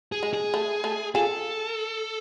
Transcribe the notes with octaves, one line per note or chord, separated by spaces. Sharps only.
G#4
G#3
G#4
A3
A3
F4 G#4 A4